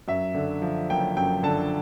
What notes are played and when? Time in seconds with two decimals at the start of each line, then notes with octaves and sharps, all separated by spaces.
0.08 F#2 E5
0.35 D3
0.62 F3
0.90 F#1 G5
1.17 F#2 G5
1.43 D3 A5